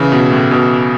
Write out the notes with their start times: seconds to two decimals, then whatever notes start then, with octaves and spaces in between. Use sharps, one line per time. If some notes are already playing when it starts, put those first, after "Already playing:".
Already playing: C#3 E3
0.12 B2
0.31 A2
0.51 B2